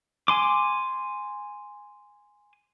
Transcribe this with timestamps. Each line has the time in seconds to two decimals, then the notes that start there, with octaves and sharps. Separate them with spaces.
0.28 G#5 C6 D6